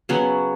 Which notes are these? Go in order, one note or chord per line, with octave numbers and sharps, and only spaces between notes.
C#3 F#3 B3 C#4